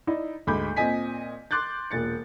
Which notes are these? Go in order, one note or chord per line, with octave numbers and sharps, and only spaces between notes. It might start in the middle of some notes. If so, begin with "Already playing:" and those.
D#4 E4 D5
D2 G#2 B5 D6 G6
A#2 C4 D#5 G#5 B6
C6 D6 F#6 G6 A6
E1 A#2 A6 C#7